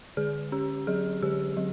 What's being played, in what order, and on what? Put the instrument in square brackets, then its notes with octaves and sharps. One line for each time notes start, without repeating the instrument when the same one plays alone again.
[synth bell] D3 G#4
C#4 G4
F#3 G#4
D3 G4
F#3